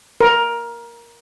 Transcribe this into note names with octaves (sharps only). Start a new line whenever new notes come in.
A#4